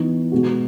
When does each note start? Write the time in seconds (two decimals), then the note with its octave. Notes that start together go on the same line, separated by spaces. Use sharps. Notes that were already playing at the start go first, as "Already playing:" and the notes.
Already playing: E3 B3 D#4
0.32 B2 G#3 B3 F#4